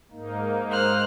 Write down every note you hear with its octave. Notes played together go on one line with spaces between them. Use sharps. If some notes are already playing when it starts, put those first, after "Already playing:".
G#2 A#3 D#4
C5 F6 F#6